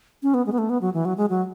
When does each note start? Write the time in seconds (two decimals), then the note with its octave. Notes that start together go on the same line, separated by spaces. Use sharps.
0.23 C#4
0.34 B3
0.46 G#3
0.52 B3
0.58 A3
0.70 B3
0.81 F#3
0.94 E3
1.05 F#3
1.17 G#3
1.30 F#3